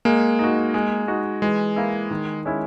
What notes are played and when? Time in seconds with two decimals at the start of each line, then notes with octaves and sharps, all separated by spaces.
0.05 G#3 A#3
0.39 D#4 F#4
0.74 G#3
1.08 D#4 F#4
1.42 E3 G#3
1.76 A#3 E4 G#4
2.11 D#3
2.45 G#3 C#4 E4